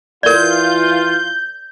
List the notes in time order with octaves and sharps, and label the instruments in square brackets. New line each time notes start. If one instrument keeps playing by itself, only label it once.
[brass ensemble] E3 F4 [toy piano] A#4 D5 [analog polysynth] G6